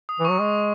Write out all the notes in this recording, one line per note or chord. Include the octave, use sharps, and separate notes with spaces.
D#6
E3 C#6
F#3
G#3